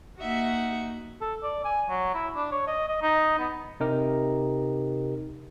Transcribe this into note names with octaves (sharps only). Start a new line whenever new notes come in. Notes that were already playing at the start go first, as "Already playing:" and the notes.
A#3 D#4 F#4 E5 F#5
A4
D5
G#5
F#3
E4
D4
C#5
D#5
D#5
D#4
B3
C3 D#4 G4 A#4